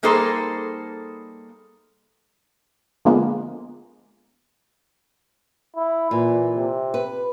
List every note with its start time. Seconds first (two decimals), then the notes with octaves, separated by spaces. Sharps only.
0.03 G3 A#3 D#4 G#4 A4 C5
3.05 D3 F3 G#3 A#3 B3
5.76 E4
6.11 A#2 E3
6.56 C3
6.94 B4